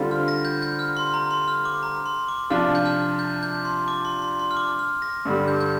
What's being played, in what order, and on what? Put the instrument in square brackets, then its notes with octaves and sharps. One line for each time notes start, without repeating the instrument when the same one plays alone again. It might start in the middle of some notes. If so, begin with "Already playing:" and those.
Already playing: [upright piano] D3 G3 C4 F4
[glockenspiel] F6
A#6
G6
G6
F6
C6
A#5
C6
F6
D6
A#5
C6
D6
[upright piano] C3 F3 D4 F4 [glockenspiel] F6
[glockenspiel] G6
F6
G6
G6
C6
D6
C6
C6
C6
F6
D6
F6
A#6
[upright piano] G2 D3 G3
[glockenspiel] G6
G6